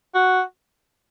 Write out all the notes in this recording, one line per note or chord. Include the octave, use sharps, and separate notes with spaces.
F#4